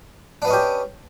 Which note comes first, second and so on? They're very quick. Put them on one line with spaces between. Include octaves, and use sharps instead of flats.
D4 B3 D#5 C#4 G4